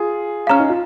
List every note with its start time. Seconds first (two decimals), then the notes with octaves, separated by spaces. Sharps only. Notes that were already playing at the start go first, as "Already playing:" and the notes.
Already playing: F4 G#4
0.47 C#4 F5 A#5 F6
0.60 D#4
0.69 F4